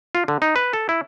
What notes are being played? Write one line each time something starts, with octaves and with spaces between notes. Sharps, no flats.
F4
D3
D#4
B4
A4
E4